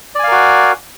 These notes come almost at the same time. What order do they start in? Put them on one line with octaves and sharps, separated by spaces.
D5 G#5 F5 A#4 F#4